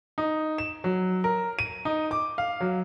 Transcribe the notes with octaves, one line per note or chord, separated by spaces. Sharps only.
D#4
E7
F#3
A#4
D#7
D#4
D6
F5
F#3